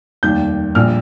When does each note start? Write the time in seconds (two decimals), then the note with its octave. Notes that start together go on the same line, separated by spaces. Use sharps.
0.23 F1 D#2 D#3 G3 G6
0.75 A#1 A#2 G3 F6